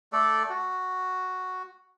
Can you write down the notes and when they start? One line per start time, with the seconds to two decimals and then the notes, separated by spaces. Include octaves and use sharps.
0.13 A3 A4 D5
0.50 F#4